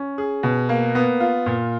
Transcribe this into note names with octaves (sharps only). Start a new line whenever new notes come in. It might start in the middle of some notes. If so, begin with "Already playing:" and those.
Already playing: C#4
G#4
B2
A#3
B3
F4
A#2